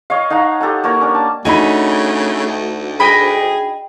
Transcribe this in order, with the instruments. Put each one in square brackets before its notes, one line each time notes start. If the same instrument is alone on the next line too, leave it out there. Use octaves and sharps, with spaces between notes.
[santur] C#5 D#5 F5
D#4 F5 F#5 A#5
G4 A4 F#5 A#5
A#3 A#4 C#5 A#5
C#4 D4
A5
[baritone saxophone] C#3 [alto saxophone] A3 [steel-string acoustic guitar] D4 D#4 F#4 [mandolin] G#5 B5
[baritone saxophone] D2
[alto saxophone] G#4 [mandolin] D#5 G5 B5